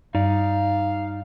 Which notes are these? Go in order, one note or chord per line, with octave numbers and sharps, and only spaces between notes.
G2 D#4 D5 F5